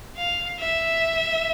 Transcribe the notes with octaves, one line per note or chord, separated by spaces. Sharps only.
F5
E5